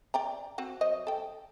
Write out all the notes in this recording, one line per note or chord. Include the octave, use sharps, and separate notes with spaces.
D5 G5 A#5
C4 F#4 F#5
F#3 C5 D#5
A4 G5